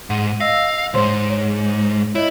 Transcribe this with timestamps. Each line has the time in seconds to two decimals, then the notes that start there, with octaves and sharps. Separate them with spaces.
0.10 G#2 F#5 D#7
0.40 D#5 F5 E6 A#6
0.94 C#2 G#2 C5 C#5 C6
1.26 C#5 D7
2.15 E4 C#5 D#5